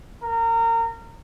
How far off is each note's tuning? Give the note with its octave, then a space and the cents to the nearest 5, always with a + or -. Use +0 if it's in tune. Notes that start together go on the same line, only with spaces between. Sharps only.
A#4 -25